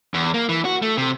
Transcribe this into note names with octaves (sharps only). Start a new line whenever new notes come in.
E2
A#3
E3
F#4
A3
C3